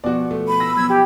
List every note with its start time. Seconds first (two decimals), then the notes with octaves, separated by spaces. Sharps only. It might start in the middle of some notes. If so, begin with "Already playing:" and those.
0.04 B2 F3 F#4 D5 C#6
0.31 A3
0.48 B5
0.60 E4 E6 A#6
0.76 B2 F3 F#3 E6 G#6
0.89 G4